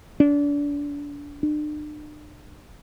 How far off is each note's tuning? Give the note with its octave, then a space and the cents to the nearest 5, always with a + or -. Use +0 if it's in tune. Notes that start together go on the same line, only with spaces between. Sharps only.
D4 -30
D4 +40